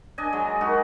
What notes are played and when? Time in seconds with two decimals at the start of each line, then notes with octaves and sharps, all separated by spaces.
0.18 D4 D#5 G#5
0.33 F#3 G#3
0.61 G#3 D#4 F#4 A#4